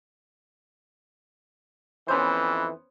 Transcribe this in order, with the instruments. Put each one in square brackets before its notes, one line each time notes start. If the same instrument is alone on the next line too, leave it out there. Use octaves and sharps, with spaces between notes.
[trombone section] F2 E3 [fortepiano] B3 C#4 C5